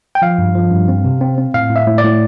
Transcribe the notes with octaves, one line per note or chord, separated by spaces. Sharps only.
G5
F3 F5
G2
F3
G2
C4
C3
C4
C4
A2 F5
A2
E5
A2
D5
A2